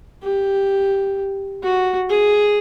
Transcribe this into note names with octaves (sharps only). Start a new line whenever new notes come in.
G4
F#4
G#4